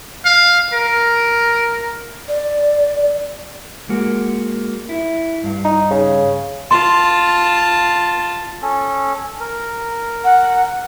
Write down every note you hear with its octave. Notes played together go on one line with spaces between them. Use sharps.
F5
A#4
D5
G#3 A#3 F#4
E4
G2 F5
D#4
C#3
F4 A5 C6
C#4 A4
A#4
F#5